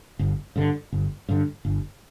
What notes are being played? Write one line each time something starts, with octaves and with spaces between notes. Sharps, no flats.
G1
G2 D3
G1
G2 D3
G1